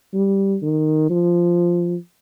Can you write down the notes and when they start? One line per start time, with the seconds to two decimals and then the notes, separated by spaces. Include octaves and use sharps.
0.14 G3
0.62 D#3
1.10 F3